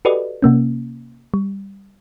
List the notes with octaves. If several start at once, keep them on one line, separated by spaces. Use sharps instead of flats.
F#4 G4 A4 B4 D5 D#5
C3 A#3 C#4
G3